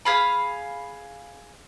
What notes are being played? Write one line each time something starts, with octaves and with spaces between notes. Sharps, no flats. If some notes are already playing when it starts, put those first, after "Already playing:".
G#4 F5 B5